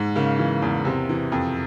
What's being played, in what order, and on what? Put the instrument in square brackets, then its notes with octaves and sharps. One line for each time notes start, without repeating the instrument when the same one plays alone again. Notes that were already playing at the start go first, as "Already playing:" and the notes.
Already playing: [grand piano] G#2
C#3 A#3
E3
E2
C3
E3
F2